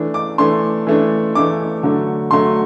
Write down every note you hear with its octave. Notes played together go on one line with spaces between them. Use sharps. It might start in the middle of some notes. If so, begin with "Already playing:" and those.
Already playing: E3 A3 D4
D6
E3 A3 D4 C6
E3 A3 D4
E3 A3 D4 D6
D3 F#3 A3
D3 F#3 A3 C6